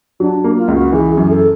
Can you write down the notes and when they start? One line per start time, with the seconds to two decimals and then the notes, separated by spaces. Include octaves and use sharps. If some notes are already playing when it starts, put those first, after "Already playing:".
0.20 F#3 D4
0.44 A#3
0.56 F4
0.68 C#2
0.74 F#4
0.92 E3 G#4
1.11 G#4
1.17 F#2
1.29 A4